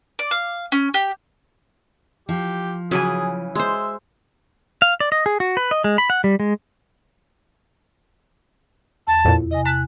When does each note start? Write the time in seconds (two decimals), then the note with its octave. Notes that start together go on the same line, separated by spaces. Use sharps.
0.19 D5
0.31 F5
0.72 C#4
0.94 G4
2.29 F3 G4
2.91 C#3 E3 F#3 G#4 G#5
3.55 G#3 C5 E5
4.82 F5
5.00 D5
5.12 D#5
5.26 G#4
5.40 F#4
5.57 B4
5.71 D#5
5.84 G#3
5.98 B5
6.10 F#5
6.24 G3
6.40 G#3
9.07 E2 A5
9.25 F2 A#2 E4
9.51 C3 D#5 G#5
9.65 A5 F#6 B6 E7